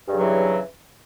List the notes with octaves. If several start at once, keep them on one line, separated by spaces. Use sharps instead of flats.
G2 C#3 E3 F#3